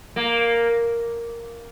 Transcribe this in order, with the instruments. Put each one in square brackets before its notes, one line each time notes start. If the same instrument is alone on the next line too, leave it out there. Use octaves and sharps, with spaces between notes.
[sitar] A#3